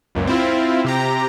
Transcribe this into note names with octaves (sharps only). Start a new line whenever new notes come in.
C#2 F#2 A#2
C4 E4 F4
C3 G4 A#5